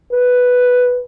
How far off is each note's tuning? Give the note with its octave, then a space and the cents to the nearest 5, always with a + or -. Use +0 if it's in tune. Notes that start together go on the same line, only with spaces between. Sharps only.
B4 +0